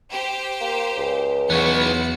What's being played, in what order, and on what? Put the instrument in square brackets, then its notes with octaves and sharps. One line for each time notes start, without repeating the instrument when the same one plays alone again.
[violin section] G4 C5
[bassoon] A#3
C#2
[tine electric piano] E2 [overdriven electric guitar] B3 C#5 [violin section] E4 F#4 C#7